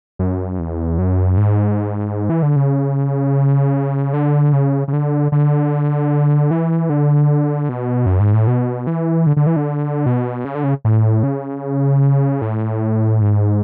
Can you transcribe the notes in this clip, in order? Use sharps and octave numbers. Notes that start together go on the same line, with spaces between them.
F#2
E2
F#2
G#2
E3
D3
C#3
D3
C#3
C#3
D3
D3
E3
D3
B2
F#2
G#2
A2
B2
E3
D3
D3
E3
D3
B2
C#3
D3
C#3
A2
C#3
A2
G#2